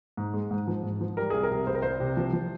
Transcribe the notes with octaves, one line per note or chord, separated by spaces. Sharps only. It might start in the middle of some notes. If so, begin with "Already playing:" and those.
G#2
G#3
G#2
F3
G#2
F3
G3 A#4
C2 G#4
A#4
C3
C2 C5
A#4
C2 C5
C3
F3
F3